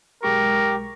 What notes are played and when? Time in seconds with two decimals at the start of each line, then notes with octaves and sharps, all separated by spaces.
0.23 B1 G#3 G4 A#4 C#6